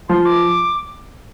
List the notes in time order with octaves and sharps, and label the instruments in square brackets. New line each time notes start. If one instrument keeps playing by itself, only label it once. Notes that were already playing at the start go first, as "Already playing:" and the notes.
[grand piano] F3 [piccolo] C6
[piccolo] D6